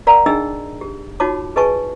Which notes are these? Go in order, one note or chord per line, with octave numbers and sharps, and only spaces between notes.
A#4 D5 F5 F#5 A#5
D4 D#4 G#4 D#5 G5 E6
G4
D#4 F4 F#4 C#5 A5 D6
G#4 B4 D#5 G#5 A5 C#6